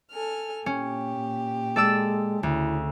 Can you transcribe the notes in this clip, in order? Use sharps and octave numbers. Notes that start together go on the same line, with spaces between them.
A4 G#5 F6
A#2 C#4 G4
G#3 A4 D5 E6
D2 C#3 E4